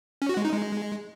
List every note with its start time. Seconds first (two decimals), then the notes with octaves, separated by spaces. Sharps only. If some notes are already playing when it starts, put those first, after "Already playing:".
0.22 C#4
0.29 F#4
0.37 G#3
0.45 D#4
0.52 G#3